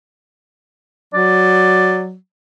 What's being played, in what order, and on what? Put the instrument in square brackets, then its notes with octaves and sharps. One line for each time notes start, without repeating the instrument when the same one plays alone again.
[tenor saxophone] F#3 [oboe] D5